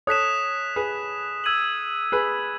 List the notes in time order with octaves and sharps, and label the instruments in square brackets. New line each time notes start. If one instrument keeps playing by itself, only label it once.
[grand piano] A4 C#5 [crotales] D#6 F#6 B6 E7
[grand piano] G#4 B4
[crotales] E6 G#6 D#7 F#7
[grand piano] G#4 B4